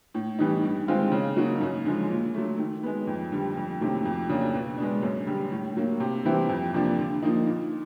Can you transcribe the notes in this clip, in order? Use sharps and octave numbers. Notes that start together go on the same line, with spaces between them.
A2
E3 G3 B3 D#4
G2
D#3 G#3 C4 F4
C#3
F#3 A#3 D#4 F#4
F#2
D3 F3 G#3
A#2
F#3 A3
D#3
G#3 B3
F2
D3 G3
F2
C3 D#3 F#3 A3
F2
C#3 F#3 A#3 D4
B2
G#3 B3 D4
F#2
D3 G3
A2
F#3 A#3
C3
E3 G3 C4 E4
F2
C3 F3 A#3 D4
D3
F3 A#3 D#4
A#2